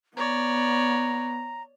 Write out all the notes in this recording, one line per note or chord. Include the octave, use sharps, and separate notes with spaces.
B3 C#5 D5 A#5